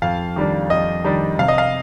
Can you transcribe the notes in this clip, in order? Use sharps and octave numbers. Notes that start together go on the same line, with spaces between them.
F2 F5
D#3 G3 D4
F2 D#5
D#3 G3 D4
C3 F5
D#5
F5